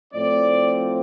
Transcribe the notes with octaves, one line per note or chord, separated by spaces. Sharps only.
A2 F3 C4 D5